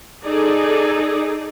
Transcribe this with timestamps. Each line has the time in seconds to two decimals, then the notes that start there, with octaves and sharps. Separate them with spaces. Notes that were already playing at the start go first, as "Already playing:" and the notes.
0.23 D#4 G#4 A4 D5